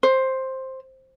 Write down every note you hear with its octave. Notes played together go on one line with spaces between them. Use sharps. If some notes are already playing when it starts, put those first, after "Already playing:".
C5